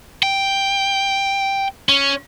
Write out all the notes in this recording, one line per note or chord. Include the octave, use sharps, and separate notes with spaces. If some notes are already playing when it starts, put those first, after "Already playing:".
G5
C#4